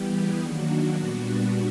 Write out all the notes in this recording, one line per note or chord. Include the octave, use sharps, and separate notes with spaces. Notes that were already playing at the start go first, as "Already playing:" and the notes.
Already playing: E3 G3 B3 G4
G#4
D#3 F#3 A#3 D4 F#4
A#2 G3 B3 D4 F#4